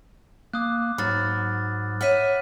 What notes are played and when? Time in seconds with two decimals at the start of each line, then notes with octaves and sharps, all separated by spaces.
0.53 A#3 D6 D#6 F#6
0.98 G#2 F#3 B5 F6 A6
2.01 C#5 E5 F#5 F6 B6 D#7